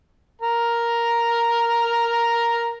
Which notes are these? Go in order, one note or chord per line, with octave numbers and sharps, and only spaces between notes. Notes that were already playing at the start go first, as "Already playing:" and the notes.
A#4 A#5